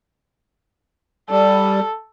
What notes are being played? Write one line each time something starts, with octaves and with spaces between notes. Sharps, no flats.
G3 A4